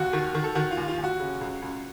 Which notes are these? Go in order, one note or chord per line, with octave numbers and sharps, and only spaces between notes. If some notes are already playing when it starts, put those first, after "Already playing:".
Already playing: D#2 F#4
D#3
D#3
A4
D#3 F#4
F4
D#2
F4
D#2
F#4
C#3
C#2
C#2